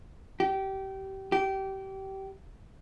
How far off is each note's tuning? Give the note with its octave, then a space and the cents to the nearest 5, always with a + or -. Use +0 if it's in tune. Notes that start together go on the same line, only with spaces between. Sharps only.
G4 -25
G4 -25